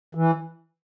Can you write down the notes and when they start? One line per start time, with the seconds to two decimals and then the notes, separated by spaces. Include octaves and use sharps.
0.15 E3